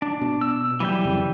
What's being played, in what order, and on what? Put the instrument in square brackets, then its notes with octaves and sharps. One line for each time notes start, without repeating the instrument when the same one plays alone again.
[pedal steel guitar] D4
[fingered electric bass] B2
[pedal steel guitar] E6
[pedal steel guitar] E3 G3 G5 [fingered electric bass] F#3
[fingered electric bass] F2 C#3 C4